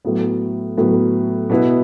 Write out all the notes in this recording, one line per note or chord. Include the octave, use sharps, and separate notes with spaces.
A2 F#3 B3
A2 F#3 B3
B2 B3 E4